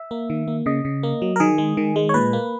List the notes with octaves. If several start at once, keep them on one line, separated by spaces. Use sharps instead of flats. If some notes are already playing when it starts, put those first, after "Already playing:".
Already playing: E5
A#3
D#3
A#3
C#3 D#5
C#3
A#3
F#3
A#4
D#3 G#4
G#3
D#3
G#3
C#5
A#2 B4
A#3